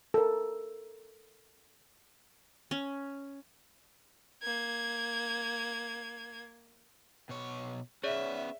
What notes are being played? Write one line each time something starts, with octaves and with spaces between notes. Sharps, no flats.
A4 A#4
C#4
A#3 G#6
B2 C#5
B3 C#4 G#4 C#5 D5 E5